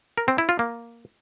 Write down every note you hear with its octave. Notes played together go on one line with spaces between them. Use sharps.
A#4
C4
E4
F4
A#3